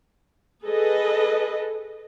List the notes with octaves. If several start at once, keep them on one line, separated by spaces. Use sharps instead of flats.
G#4 A4 B4 D#5